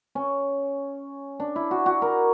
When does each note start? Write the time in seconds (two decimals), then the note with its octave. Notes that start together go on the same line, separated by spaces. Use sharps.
0.15 C#4
1.40 D4
1.56 E4
1.71 F#4
1.86 F#4
2.02 A#4